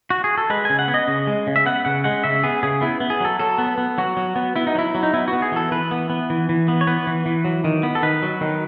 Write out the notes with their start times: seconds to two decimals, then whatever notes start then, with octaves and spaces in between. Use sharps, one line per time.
0.10 F#4
0.24 G#4
0.38 A4
0.50 G#3 B4
0.65 C#3 G#5
0.79 F#5
0.88 B3
0.94 D#5
1.08 C#3
1.27 G#3
1.47 C#3
1.56 E5
1.66 B3 F#5
1.85 C#3 F#5
2.04 G#3 F#5
2.24 C#3 E5
2.43 B3 G#4
2.63 C#3 G#4
2.81 B3 E4
3.00 B3
3.10 G#4
3.21 F#3 A4
3.39 F#3 A4
3.58 B3
3.78 B3
3.98 F#3 F#4
4.17 F#3
4.36 B3
4.56 B3 E4
4.67 D#4
4.75 F#3 E4
4.95 F#3
5.03 D#4
5.14 B3 E4
5.28 F#4
5.33 B3
5.42 G#4
5.52 E3 A4
5.71 E3 B4
5.91 B3
6.10 B3
6.30 E3
6.49 E3
6.68 B3
6.81 C#5
6.87 B3 B4
7.07 E3
7.26 E3
7.45 F#3
7.64 D#3
7.83 B3
7.95 A4
8.03 D#3 B4
8.23 F#3
8.41 D#3